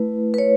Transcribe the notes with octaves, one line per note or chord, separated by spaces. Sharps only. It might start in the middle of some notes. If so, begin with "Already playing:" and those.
Already playing: A3 E4 B4
B4
C#5